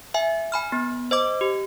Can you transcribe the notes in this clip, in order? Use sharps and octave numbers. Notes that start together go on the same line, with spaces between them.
E5 G#5
G#5 B5 F6
B3
C5 D#5 D6
G4